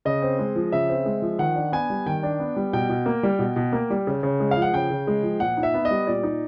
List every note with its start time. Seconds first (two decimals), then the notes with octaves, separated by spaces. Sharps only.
0.05 C#3 D#5
0.22 C4
0.39 G#3
0.56 F3
0.72 C#3 E5
0.89 C4
1.06 G#3
1.22 F3
1.39 D#3 F#5
1.56 D4
1.72 B3 G#5
1.90 G3
2.06 D#3 G5
2.23 D4
2.40 B3
2.56 G3
2.73 B2 G5
2.90 B2
3.06 A#3
3.23 G3
3.39 B2
3.56 B2
3.72 A#3
3.90 G3
4.07 C#3
4.23 C#3
4.40 G#3
4.51 F5
4.57 F3
4.62 F#5
4.73 C#3 G5
4.90 C#3
5.07 G#3
5.23 F3
5.40 A#2 F#5
5.57 D#4
5.63 E5
5.74 B3
5.85 D#5
5.91 G3
6.07 A#2 D5
6.23 D#4